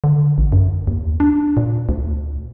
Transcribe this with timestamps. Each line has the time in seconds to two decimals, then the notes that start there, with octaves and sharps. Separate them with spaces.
0.04 D3
0.38 A1
0.52 F#2
0.87 D#2
1.20 D4
1.57 A#2
1.89 D2